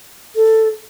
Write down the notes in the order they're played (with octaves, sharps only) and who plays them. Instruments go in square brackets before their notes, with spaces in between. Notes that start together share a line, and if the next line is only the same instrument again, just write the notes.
[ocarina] A4